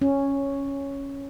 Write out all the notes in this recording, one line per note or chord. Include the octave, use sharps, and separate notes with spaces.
C#4